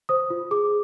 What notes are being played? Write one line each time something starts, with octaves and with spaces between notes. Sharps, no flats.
C5 D#6
F4
G#4 D6